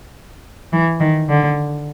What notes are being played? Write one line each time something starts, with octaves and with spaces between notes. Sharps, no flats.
E3
D#3
D3